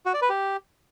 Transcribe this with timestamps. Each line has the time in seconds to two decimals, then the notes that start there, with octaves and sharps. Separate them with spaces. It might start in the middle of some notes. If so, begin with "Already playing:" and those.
0.06 F#4
0.14 D5
0.22 B4
0.30 G4